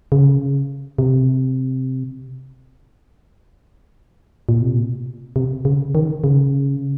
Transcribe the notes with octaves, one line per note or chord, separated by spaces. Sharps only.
C#3
C3
A#2
C3
A#2
C3
C#3
D#3
C#3